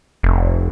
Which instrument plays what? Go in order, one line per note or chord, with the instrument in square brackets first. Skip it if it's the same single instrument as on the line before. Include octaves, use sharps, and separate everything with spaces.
[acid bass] F1